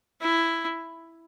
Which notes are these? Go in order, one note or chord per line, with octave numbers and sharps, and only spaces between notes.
E4